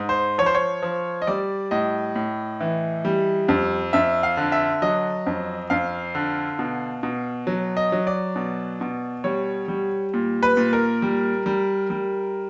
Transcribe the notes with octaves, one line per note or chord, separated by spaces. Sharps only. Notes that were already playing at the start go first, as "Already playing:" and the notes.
Already playing: G#2
C5
F3 C#5
C5
C#5
F3
D#5
G3 D5
A2 D#5
A2
E3
G3
F2
F2 E5
F5
D3
E5
F#3 D#5
F2
F2 F5
D3
B2
B2
F#3
D#5
F#3
D5
B2
B2
G3 C#5
G3
A#2
B4
A#2
A#4
G3
G3
G3